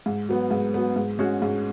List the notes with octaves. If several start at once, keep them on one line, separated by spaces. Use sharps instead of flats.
G#2
F#3 B3
G#2
F#3 B3
G#2
G#3 C#4 F#4
G#2